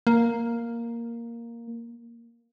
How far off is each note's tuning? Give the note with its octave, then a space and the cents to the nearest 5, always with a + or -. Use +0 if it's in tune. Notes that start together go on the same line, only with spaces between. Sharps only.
A#3 +0